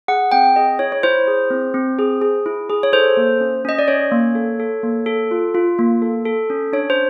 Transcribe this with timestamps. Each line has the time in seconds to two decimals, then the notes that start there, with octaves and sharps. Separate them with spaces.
0.08 G#4 F#5
0.32 C4 G5
0.56 G#4 D#5
0.79 E4 C#5
0.92 C#5
1.03 E4 C5
1.27 G#4
1.50 C4
1.74 C4
1.99 G#4
2.22 G#4
2.46 E4
2.70 G#4
2.83 C#5
2.93 A4 C5
3.17 A#3
3.41 C#4
3.65 C#4 D#5
3.79 D5
3.88 C#4 C#5
4.12 A#3
4.35 A4
4.59 A4
4.83 A#3
5.06 A4
5.31 F4
5.55 F4
5.78 A#3
6.02 A4
6.25 A4
6.50 C#4
6.73 D4 C#5
6.90 C5